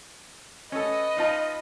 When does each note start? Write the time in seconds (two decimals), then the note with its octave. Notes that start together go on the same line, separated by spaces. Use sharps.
0.72 C#4 A4 B4 D#5
1.17 D#4 F4 A5